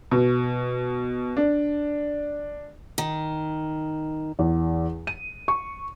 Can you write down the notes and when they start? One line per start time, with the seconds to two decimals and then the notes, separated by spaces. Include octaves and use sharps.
0.11 B2
1.37 D4
2.98 D#3
4.39 E2
5.07 D#7
5.48 C#6